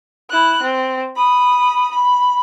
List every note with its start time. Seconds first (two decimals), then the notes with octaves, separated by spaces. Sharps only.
0.30 E4 F#6
0.63 C4
1.16 B5 D#6
1.91 B5